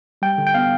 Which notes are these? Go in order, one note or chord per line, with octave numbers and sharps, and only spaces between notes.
G3 G5
D3
G5
B3 F5